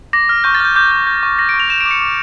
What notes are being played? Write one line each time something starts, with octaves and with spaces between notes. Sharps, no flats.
D6 A#6
F6
C#6 G6
A6
F6 G6
D6 G6
G6
G6
C#6
C#6 A#6
D7
C#6
F7
G6 E7
D7
D6
C#7
D6